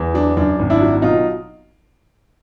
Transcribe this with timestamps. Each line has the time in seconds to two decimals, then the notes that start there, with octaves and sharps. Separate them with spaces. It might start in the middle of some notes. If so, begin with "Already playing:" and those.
Already playing: E2
0.14 F#3 D4
0.37 F#2 D4
0.59 G#1
0.70 D4 E4
0.81 F#3
1.02 B2 D#4 F4